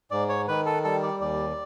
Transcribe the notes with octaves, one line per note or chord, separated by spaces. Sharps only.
G#2 D5
C#5
D#3 B4
A4
G3 A4
D5
D#2 D5